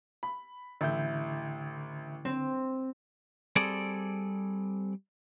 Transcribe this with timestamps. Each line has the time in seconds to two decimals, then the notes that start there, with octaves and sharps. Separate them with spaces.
0.23 B5
0.81 A1 D3 E4 G6
2.25 C4
3.56 G3 C4 G#4 A4 D5